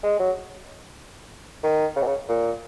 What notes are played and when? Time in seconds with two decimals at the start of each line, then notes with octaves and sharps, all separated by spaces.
0.03 G#3
0.19 F#3
1.63 D#3
1.96 C#3
2.02 B2
2.06 C#3
2.28 A#2